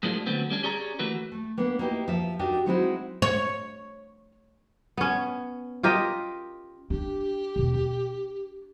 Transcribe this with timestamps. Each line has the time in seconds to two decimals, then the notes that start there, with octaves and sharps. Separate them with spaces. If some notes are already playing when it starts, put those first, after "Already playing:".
0.03 A2 F3 F#3 G#3 A#3 D4
0.26 D3 F#3 A3 B3 C4
0.50 G3 C#4 D4
0.63 C#4 G4 G#4 C#5 D5 A#5
0.99 E3 A3 A#3 F#4 B4
1.32 A3
1.58 A#3 B3 D4
1.79 A#3 D#4 E4 G4
2.08 F3 E5
2.39 D4 D#4 F#4 G4 A#4
2.66 F#3 G#3 C4 D#4 E4 F#4
3.22 C#5
4.97 B3 C#4
5.83 F4 G4 A#4 D#5
6.90 D4 G4
7.56 E2 B2
7.72 D4